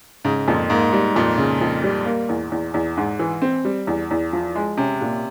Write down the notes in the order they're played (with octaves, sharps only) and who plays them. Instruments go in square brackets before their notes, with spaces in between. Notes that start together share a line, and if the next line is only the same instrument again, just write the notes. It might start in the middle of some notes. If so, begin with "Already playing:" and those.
[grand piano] G#2 [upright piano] C#3
[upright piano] F2 [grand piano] A#2
[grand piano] G#2 [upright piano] A#3
[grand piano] G#2 [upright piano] G3
[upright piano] F2 [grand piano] A#2
[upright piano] C#3
F2
G3
A#3
E2
E2
E2
G#2
E3
C4
G3
E2
E2
F3
G#3
[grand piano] C3 [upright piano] C#4
[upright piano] A#2